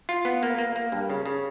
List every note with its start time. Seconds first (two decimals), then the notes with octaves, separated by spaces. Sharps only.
0.09 F4
0.25 B3
0.43 A#3
0.58 A#3
0.76 A#3
0.92 G2
1.10 C#3
1.25 C#3